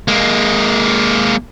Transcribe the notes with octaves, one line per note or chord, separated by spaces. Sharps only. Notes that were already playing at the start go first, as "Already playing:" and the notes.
G#3 A#3